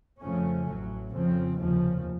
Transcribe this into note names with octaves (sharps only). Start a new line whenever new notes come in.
F2 C#3 F3 A3 C#4
A1 A2 F#3
F2 C#3 F3 C4
F1 D#2 C#3 F3